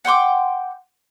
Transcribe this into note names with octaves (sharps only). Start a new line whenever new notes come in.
F#5 G5 C6 D6